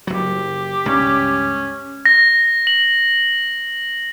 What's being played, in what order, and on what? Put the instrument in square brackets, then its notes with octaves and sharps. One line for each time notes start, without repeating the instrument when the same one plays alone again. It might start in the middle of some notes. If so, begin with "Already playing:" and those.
[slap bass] F#1 F#3 [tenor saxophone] G4
[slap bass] C#2 G2 [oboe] C#4
[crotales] A#6
F#7